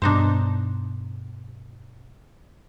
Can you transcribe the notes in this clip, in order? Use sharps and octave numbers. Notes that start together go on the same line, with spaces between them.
G2 B2 D4 D#4 C5